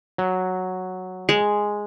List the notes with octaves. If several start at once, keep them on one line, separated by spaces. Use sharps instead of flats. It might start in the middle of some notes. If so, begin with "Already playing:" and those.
F#3
G#3